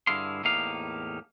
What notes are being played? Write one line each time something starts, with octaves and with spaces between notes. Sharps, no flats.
G2 D3 E4 G#4 F5 C6
E2 A2 A#3 D#4 G4 F5